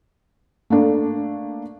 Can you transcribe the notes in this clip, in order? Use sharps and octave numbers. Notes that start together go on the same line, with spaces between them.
A3 A#3 D4